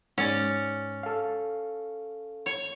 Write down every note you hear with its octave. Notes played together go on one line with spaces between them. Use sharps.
G#2 C#4 D5
A4 F5
C#5